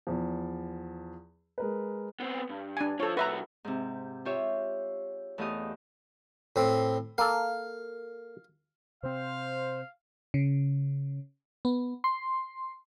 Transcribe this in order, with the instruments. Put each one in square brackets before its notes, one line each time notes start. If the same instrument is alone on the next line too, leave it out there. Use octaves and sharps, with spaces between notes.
[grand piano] E2 F3
G#3 A#4 B4
[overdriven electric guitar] B3 C4
G2
[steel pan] D4 G#5
[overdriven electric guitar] F3 F4 [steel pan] A4 C#5
[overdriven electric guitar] C2 F#4 [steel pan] B4 E5 A#5
[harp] G#2 C3
F4 G4 C#5 E5
E2 A3 G4 D#5 F5 D#6
[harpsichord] A2 C4
[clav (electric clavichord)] A#3 A4 [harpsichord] F5
[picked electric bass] C3 C4 [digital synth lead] C5 [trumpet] F5
[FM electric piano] C#3
B3
C6